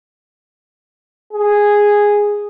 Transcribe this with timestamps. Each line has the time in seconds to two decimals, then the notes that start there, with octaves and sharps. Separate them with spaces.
1.33 G#4